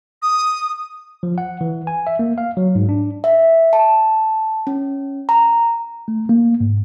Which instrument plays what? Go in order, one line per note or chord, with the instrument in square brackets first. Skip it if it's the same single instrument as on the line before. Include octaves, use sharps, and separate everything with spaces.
[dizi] D#6
[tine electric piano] F3
F#5
E3
G#5
E5
A#3
F5
F#3
G#2
D4
[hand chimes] E5
A5
C#4
A#5
[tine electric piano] A3
A#3
G#2